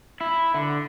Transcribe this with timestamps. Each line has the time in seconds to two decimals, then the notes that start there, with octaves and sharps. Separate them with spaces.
0.21 E4
0.54 D3